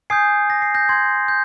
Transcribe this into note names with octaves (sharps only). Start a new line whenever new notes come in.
G#5 D#6 G6 G#6 C7
A#6
C7
G6 A#6
C6 G6 G#6
G6